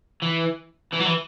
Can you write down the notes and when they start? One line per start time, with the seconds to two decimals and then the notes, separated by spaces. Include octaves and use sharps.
0.22 E3
0.93 E3
1.00 F#3
1.07 E3